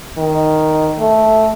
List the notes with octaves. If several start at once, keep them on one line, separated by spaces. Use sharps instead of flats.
D#3
A3